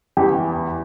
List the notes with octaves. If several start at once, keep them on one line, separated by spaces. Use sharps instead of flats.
E2 E3 G4